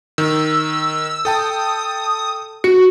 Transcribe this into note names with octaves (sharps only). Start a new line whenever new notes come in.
D#3 E6
A4 G5 A5 D#6
F#4 C#7